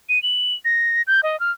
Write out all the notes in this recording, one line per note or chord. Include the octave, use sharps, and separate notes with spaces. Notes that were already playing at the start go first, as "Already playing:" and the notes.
D#7
F#7
A#6
G6
D#5
F6